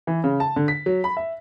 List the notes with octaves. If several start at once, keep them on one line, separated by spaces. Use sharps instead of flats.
E3
C#3
A5
D3
B6
F#3
B5
E5